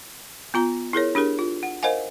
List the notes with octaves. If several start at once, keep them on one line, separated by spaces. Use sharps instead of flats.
B3 F4 A#5
E4 G#4 A#4 C#5
D4 G4 G#4 A#4
F4
F#5
A#4 C5 D#5 F5 F#5 G#5